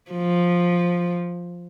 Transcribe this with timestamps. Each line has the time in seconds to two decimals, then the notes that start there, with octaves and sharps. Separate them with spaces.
0.12 F3